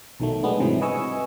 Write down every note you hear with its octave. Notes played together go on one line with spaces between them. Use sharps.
B1 B2 D#3 F#3 A3
F#3 G#3 A3 B3 D4
G#2 C3 D#3 E3 F#3 G3
B4 D#5 G#5 C#6 E6